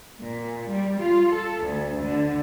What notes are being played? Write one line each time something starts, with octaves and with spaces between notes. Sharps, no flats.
A#2
G3
F4
A4
D2
D3